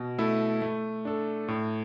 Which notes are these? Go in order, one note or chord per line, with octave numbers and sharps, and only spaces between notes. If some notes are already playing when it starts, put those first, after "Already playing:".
Already playing: B2
A3 E4 A4
A3
D4 A4
A2